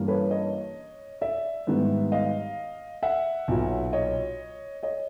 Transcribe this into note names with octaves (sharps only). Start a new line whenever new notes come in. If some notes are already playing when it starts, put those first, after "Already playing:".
Already playing: G2 E3 G3 A#3 C#4
B4 C#5
C#5 D#5
D5 E5
G#2 D#3 G3 B3
D#5 F5
E5 F#5
B1 A#2 F#3
C#5 D#5
C#5 D#5